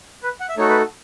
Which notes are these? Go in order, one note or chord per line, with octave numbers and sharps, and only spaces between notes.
B4
F#5
E5
A3 D#4 F#4 A4 C#5
B4